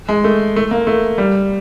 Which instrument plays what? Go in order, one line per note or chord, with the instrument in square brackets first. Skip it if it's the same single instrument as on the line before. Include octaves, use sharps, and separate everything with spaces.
[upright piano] G#3
A3
A3
A#3
A3
G3